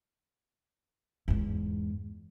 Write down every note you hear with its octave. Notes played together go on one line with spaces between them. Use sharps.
E2 G#2